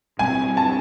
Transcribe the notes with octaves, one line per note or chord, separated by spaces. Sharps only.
B2 G3 C4 G#5
A5